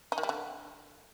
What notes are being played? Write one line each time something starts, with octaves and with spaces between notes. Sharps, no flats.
D#4
D#3
G3
D3